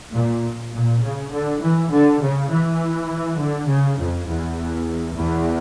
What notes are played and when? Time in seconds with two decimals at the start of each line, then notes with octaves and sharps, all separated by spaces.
0.13 A#2
0.73 A#2
1.02 C#3
1.32 D3
1.61 E3
1.91 D3
2.21 C#3
2.50 E3
3.39 D3
3.68 C#3
3.99 F2
4.28 E2
5.16 E2